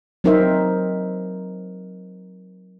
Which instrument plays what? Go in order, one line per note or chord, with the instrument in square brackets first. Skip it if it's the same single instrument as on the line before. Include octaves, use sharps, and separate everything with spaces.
[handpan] F#3 C4 D#4 A#4 C5 E5